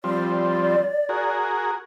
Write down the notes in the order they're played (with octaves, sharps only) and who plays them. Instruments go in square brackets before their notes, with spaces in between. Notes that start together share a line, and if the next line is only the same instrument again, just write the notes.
[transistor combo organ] F3 G3 C4 [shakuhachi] D5
[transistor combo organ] F#4 G#4 A#4